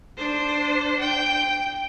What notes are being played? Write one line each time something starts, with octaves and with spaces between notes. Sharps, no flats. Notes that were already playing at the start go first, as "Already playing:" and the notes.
D4 C5
G5